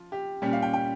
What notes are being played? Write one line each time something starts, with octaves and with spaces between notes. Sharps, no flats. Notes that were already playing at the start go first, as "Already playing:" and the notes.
Already playing: F3 F4
G4
A#2 G3 C#4 G4
F5
G5
G5